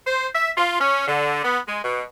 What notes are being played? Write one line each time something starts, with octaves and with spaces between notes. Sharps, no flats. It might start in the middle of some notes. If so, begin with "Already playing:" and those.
C5
E5
F4
C#4
D3
B3
G#3
B2